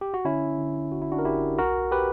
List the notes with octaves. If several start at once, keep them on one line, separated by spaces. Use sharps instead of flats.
G4
F#4
D3 C#4 E4
D3
G1 F#4
E4
D4 F#4
A#4
G1 E4 G4
B1 F#4 A#4
G4 B4